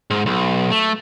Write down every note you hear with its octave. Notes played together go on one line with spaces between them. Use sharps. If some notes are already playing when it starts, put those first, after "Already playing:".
G#2
B1
A3